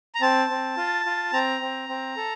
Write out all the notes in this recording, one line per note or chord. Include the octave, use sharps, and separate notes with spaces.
A#5
C4 A5
C4
F4
F4
C4 A#5
C4
C4
A4